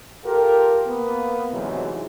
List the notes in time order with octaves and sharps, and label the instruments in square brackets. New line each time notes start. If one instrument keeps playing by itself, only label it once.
[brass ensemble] F4 G4 A4 A#4
A#3 B3
D2 G#2 C3 E3 F#3